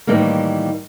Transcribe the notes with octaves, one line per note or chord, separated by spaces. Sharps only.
A2 D#3 E3 G3 A#3